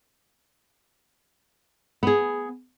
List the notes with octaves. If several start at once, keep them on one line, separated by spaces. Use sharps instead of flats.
B3 G#4